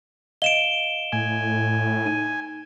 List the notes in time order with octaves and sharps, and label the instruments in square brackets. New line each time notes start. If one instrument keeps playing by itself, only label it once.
[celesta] D#5 F5 [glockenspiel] D7 E7 G7
[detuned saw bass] A2 [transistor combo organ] G#5
[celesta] D#4 D#7